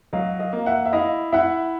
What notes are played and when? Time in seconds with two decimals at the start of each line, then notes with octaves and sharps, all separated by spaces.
0.13 F#3 D#5 F5
0.39 D#5 F5
0.53 A#3
0.66 E5 F#5
0.85 E5
0.93 E4 D#5 F5
1.32 E4 E5 F#5